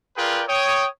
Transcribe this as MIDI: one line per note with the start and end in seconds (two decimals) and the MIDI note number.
0.17 0.43 65
0.17 0.43 68
0.17 0.43 70
0.17 0.43 71
0.17 0.43 74
0.17 0.43 79
0.48 0.87 73
0.48 0.87 79
0.48 0.87 87